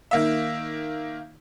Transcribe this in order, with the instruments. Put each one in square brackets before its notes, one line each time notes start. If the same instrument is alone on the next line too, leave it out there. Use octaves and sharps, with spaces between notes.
[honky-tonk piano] D#3 A#3 E5